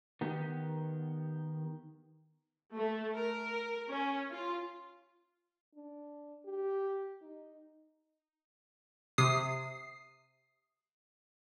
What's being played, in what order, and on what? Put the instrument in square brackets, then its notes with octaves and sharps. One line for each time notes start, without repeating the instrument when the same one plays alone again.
[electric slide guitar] D#3 B3 G4
[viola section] A3
A#4
C#4
F4
[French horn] D4
G4
D#4
[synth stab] C3 D#6 C7